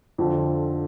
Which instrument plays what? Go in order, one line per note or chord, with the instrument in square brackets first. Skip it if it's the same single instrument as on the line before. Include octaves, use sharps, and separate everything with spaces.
[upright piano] F2 D3 F3 C4